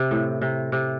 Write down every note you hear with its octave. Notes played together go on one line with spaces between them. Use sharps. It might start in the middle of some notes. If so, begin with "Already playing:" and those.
Already playing: C3
A2
C3
C3